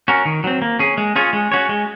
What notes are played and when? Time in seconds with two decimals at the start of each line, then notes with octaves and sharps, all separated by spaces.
0.08 C#4 F#4 A#4
0.25 D#3
0.44 F#3 C4
0.62 A#3
0.79 C#4 G#4
0.98 G#3
1.16 C#4 F4 G#4 C#5
1.33 G#3
1.52 C#4 F#4 C#5
1.69 G#3